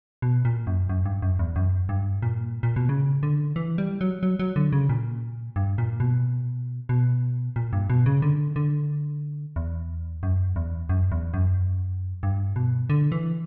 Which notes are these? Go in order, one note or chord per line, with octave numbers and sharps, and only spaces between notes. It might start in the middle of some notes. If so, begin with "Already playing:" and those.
B2
A#2
F#2
F#2
G2
F#2
E2
F#2
G2
A#2
A#2
B2
C#3
D3
E3
G3
F#3
F#3
F#3
D3
C#3
A#2
G2
A#2
B2
B2
A#2
G2
B2
C#3
D3
D3
E2
F#2
E2
F#2
E2
F#2
G2
B2
D3
E3